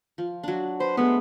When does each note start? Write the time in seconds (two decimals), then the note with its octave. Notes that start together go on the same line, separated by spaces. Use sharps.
0.18 F3
0.43 F#3 D4
0.80 B4 C5
0.97 G#3 A3 B3